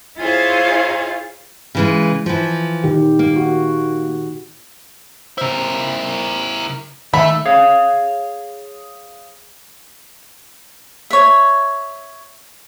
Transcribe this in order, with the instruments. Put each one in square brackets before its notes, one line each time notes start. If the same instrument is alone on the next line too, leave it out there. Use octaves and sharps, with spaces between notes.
[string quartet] E4 F4 G#4 C5 C#5 F5
[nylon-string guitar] C#3 E3 G#3
E3 F3
[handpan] A#2 D#3 G4
[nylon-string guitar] A#3
[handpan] F#4
[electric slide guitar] C#3 C5 [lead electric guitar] E4 A#4
[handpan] D#3 E5 [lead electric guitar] A3 [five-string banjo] B5
[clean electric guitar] G#4 C#5 F5
[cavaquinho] C#5 E5